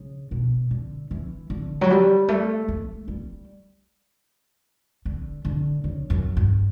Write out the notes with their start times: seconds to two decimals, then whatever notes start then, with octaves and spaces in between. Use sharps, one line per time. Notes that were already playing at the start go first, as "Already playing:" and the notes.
Already playing: C#3
0.31 B2
0.71 D3
1.11 E3
1.50 D3
1.81 F#3
1.90 G3
2.28 A3
2.68 A3
3.08 G3
5.05 D3
5.45 D3
5.84 C#3
6.10 F#2
6.37 G2